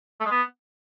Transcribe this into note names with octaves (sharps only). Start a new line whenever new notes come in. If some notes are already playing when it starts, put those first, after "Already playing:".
A3
G#3
B3